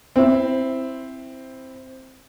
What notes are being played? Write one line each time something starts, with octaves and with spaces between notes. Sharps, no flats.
C4 E4